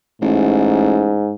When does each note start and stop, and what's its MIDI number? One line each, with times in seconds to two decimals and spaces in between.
0.22 1.21 33
0.22 1.34 44